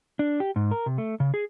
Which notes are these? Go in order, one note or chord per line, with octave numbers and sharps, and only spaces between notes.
D4
G4
G#2
A#4
C3
A3
C#3
G#4